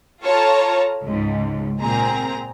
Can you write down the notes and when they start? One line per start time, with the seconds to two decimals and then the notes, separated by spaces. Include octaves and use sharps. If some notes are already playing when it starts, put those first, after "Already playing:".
0.22 F4 A4 C#5 A5 A#5
1.05 C#2 G#2
1.81 A#2 C4 G#4 A#5